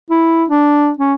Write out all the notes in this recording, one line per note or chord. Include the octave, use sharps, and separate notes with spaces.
E4
D4
C#4